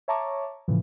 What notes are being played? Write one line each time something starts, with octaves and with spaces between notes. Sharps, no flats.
C#5 E5 A5 A#5 C#6 D6
A2 C#3 E3 F3